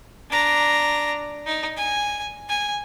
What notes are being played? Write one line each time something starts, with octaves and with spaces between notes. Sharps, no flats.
D4 A#5
D#4
G#5
G#5